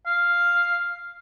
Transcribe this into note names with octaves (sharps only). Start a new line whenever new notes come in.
F5